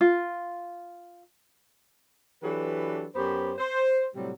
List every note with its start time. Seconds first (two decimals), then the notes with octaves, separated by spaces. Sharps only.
0.01 F4
2.43 E3 F#3 D4 G4 A4 B4
3.15 F#2 B3 G4 C5
3.58 C5
4.15 A2 C3 F#3 G3